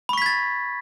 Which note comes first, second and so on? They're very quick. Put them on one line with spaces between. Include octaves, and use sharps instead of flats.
B5 C#6 B6 G#6 A6